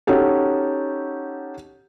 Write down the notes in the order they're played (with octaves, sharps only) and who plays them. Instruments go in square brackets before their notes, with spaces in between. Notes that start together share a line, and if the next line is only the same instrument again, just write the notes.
[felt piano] C#4 D#4 F#4 G4 A4